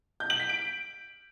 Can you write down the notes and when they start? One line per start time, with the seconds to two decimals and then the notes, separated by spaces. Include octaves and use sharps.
0.20 G6
0.30 F#7
0.40 B6
0.49 D7